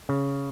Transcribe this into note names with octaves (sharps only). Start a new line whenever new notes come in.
C#3